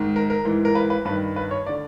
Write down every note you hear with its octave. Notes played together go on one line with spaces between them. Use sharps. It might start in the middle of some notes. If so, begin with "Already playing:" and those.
Already playing: G#2 D#3
A#4
A#4
G#2 E3
A#4
B4
B4
G2 D#3 B4
B4
C#5
D5
D3